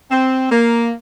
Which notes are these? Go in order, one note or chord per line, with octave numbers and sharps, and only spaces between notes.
C4
A#3